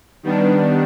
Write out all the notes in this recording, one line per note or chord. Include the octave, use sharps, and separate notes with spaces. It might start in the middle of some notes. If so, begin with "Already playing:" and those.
D#3 G3 B3 D4